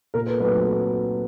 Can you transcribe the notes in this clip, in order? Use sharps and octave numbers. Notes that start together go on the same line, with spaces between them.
A#2 A#4
A4 B4
F#3 A3 C4 D#4 A4 B4
A4 B4